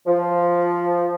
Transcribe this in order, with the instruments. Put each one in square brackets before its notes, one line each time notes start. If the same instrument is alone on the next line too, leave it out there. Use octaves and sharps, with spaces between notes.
[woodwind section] F3